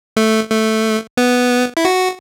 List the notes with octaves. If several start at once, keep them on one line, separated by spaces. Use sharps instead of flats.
A3
A3
B3
E4
F#4